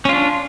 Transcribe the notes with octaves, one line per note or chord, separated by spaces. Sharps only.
C#4 D4 F4